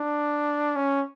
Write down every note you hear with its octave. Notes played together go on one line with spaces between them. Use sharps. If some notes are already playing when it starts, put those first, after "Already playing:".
Already playing: D4
C#4